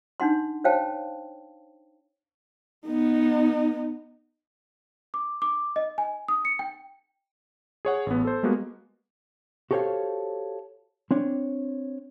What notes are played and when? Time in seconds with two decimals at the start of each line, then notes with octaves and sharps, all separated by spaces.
0.20 D4 D#4 F#5 C6
0.64 C5 C#5 F5 G5 A5
2.86 B3 D#4
5.14 D6
5.42 D6
5.76 D#5
5.98 G#5
6.28 D#6
6.45 C#7
6.59 G5
7.85 G#4 C#5 F#5
8.06 A1 B3
8.25 A4 C5
8.43 G3 G#3 A#3 B3 F#4
9.71 F#4 G4 A4 C5 C#5 F5
11.11 C4 D4 C#5